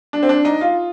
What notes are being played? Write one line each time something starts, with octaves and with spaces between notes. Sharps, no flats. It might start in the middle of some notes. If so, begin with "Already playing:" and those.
D4
C4
D4
D#4
F4